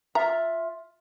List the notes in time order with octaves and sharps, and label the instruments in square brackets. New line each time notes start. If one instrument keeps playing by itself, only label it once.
[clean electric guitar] F4 E5 [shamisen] A#5